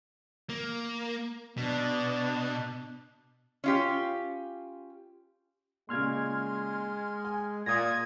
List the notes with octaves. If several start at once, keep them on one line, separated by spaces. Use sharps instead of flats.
A#3
B2 D4
C#4 F4 G4
A#2 C#3 G#3 C6 F6 G#6
G#5
A#2 F4 D#6 G#6 A#6